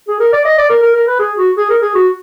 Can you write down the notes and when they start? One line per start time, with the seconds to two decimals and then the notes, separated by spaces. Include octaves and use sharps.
0.08 G#4
0.20 A#4
0.33 D5
0.45 D#5
0.58 D5
0.69 A#4
0.82 A#4
0.95 A#4
1.07 B4
1.19 G#4
1.38 F#4
1.57 G#4
1.69 A#4
1.82 G#4
1.95 F#4